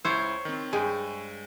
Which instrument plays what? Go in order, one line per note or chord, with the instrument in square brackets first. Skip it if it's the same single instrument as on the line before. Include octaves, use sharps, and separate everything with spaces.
[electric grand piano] C#2 E4 E6 [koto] C5 C#5
[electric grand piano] D#3 C4
[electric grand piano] G2 G5 G#5 [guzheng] G#3